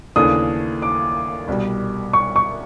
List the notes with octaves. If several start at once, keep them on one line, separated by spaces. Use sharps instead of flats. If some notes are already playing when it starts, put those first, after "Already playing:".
D#2 C#3 E3 A3 D4 D#6
D6
C2 B2 G3
C#6
C#6